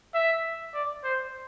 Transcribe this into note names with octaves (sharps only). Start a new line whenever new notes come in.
E5
D5
C5